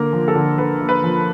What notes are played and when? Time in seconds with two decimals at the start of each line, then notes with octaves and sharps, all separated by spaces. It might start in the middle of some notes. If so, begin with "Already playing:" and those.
Already playing: D3 A#3 A#4
0.13 F3
0.28 A4
0.35 D3
0.58 D3 B4
0.81 A#3
0.89 B4
1.04 F3